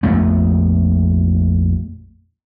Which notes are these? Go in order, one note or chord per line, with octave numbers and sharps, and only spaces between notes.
A#1 F2 A3 B3